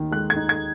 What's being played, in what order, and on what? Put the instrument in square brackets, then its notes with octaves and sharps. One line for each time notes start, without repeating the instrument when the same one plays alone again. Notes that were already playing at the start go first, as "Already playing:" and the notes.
Already playing: [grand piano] D#2 D#3 D#4
[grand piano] G#3 [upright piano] F#6
[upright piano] G#6
[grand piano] D#4
[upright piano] G#6